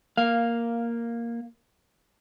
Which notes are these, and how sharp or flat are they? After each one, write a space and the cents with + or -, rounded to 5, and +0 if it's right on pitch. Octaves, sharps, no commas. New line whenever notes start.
A#3 +0 F5 +0